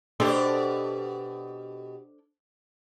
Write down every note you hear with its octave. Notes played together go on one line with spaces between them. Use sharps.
B2 D4 G4 A4 C5